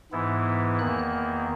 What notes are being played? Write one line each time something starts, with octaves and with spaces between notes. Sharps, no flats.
G#2 E3 B3 E4
E2 D#3 A#3 F#6